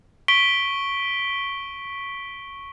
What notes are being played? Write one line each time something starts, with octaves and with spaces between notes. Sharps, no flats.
C#6 B6 D7 G7